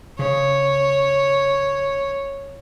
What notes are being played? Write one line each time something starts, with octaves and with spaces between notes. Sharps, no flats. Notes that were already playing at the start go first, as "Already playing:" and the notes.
C#3 C#5